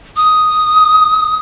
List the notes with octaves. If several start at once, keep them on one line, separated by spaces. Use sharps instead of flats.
D#6